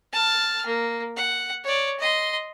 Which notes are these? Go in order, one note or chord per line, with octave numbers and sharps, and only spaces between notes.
A5 F6
A#3
F#5
C#5 D5
D#5 C6